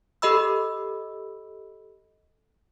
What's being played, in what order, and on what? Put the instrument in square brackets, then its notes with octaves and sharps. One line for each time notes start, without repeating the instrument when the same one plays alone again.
[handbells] G4 A4 D#5 B5 E6